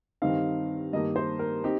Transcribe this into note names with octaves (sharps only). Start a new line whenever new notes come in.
G2 D#3 C4 D#4 F5
G2 D#3 A#3 D#4 D#5
C5
A#4
C4 D#4 G4